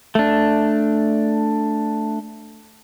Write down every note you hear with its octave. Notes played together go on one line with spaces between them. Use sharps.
A3 D4